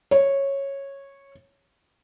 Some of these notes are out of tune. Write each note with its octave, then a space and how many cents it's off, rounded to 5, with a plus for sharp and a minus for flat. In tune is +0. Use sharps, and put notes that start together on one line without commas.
C#5 -10